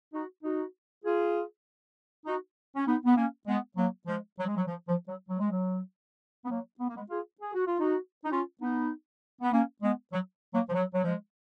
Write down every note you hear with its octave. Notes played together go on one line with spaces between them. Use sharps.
D#4 F#4
D#4 F#4
F4 G#4
D#4 F#4
C#4
B3 D#4
B3
A#3 C#4
G#3 B3
F#3 A#3
F3 G#3
F#3
G#3
F#3
F3
F3
F#3
F#3
G#3
F#3
B3
F#3 A#3
B3
A#3
G#3 B3
F4 G#4
G#4
F#4
F4
D#4 F#4
D#4
C#4 F4
B3 D#4
B3
A#3 C#4
G#3 B3
F#3
F#3 A#3
F3
F#3
F#3
F3 G#3